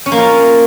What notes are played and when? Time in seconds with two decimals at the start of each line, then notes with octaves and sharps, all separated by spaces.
0.06 C#4
0.12 A#3
0.18 F4